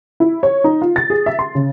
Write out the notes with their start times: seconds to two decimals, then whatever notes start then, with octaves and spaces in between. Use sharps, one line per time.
0.20 E4
0.43 C#5
0.64 D#4
0.82 F4
0.96 A6
1.10 G#4
1.26 E5
1.39 C6
1.55 C#3